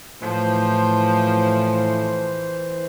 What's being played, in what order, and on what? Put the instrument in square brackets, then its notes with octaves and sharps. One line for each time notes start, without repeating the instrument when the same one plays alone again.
[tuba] A2 [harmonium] E3 C5 [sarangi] F3